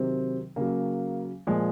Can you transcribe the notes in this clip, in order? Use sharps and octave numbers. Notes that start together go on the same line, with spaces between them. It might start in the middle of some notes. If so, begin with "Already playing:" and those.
Already playing: C3 D#3 F#3 C4
C#3 F#3 A#3
A#2 F3 G#3